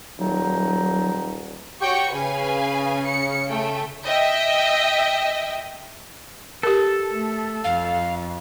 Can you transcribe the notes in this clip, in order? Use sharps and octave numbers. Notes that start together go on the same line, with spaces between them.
D#1 F#3 D#4
F#4 G4 C#5 G5 C#6
C#3 B4 F5 G#5
C#7
A3 G5
D#5 E5 G5
G4 A4 A#4
A3
F2 F5